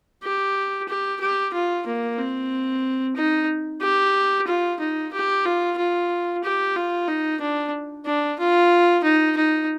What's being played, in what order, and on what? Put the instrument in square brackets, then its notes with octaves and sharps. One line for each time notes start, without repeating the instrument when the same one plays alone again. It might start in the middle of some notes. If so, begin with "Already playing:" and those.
[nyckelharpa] G4
G4
G4
F4
A#3
C4
D#4
G4
F4
D#4
G4
F4
F4
G4
F4
D#4
D4
D4
F4
D#4
D#4